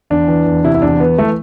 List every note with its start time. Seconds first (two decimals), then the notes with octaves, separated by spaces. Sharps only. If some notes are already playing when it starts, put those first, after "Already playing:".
0.10 E2 D4
0.28 E3
0.46 E2
0.64 C3 E4
0.75 E4
0.82 E2 D4
1.00 E3 B3
1.18 E3 A3